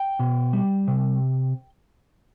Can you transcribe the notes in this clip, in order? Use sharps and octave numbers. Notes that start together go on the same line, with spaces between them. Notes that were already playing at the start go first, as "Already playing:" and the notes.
Already playing: G5
B2
G3
C3